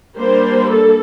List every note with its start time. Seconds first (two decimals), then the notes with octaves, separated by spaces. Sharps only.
0.18 G3 A#3 D4 C5
0.69 A4